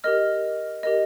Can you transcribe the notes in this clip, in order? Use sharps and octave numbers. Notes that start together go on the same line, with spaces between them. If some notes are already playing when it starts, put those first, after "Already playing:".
G4 A#4 D#5 F6
G4 A#4 D#5